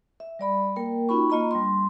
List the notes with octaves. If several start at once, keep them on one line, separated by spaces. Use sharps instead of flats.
E5
G3 D5 B5
A#3 A#4 G5
C#4 D#4 F4 F#4 B5 C#6
A#3 F4 D#5 A#5 B5
G3 D4 C6